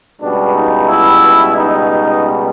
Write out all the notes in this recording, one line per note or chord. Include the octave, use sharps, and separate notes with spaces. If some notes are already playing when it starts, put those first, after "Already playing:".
C#2 B2 G3 D4
D#4
E4
D#4